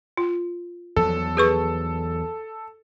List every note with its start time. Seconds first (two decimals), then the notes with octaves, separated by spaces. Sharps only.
0.17 F4
0.96 E2 F3 F#3 A4
1.37 G#4 B4 C#6